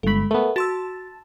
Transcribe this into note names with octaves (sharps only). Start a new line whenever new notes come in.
G1 G#3 A4 B5
A3 B3 A#4
F#4 A5 C6 E6